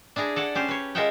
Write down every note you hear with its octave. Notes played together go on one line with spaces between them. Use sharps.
D4 E4 G#4 A#5
A4 D5 F#5
C#4 G4 C5
B4 C#5
G#3 F4 A#4 E5 F#5 G5